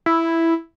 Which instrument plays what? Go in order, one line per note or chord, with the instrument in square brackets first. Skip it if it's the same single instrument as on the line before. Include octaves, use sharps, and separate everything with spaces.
[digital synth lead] E4